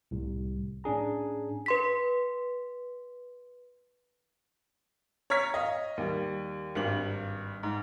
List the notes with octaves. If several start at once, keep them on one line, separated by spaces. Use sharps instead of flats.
C2 A2 C3
A2 C#4 D4 G#4 A#5
B4 C6 B6
C#5 A#5 F6 G#6 B6
D#5 F5
D#2 G3
G#1 G2 F#7
G#2